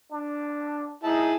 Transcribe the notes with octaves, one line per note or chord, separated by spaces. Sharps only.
D4
D#4 E4 G#4 A5